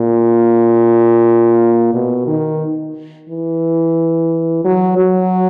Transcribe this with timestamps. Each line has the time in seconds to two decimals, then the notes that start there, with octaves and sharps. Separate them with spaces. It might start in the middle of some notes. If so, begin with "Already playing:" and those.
Already playing: A#2
1.94 B2
2.28 D#3
3.29 E3
4.64 F#3
4.98 F#3